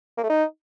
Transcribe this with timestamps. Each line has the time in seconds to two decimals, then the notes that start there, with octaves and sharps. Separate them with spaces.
0.17 A#3
0.23 A3
0.29 D#4